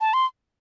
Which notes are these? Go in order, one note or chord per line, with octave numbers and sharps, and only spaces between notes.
A5
C6